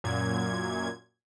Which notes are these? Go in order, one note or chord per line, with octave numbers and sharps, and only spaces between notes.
F#2 A#2 G#6